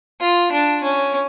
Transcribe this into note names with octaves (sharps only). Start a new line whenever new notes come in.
F4
D4
C#4